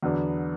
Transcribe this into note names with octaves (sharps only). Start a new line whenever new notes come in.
E2 D3 F#3 B3 D4